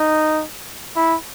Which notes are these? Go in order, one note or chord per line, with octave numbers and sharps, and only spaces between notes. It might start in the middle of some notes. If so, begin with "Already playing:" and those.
Already playing: D#4
E4